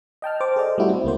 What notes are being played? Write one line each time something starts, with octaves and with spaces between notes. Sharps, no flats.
D#5 G5 A5 F6
C5 D6
G#4 A4 C5 D5 D#5
G3 A3 E4 F#4
C4
C#2 A#3 C5